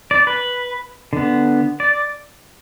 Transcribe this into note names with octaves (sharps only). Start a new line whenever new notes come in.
D5
B4
D3 B3
D5